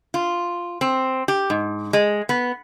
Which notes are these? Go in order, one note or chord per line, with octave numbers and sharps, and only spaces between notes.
F4
C4
G4
G#2
G#3
B3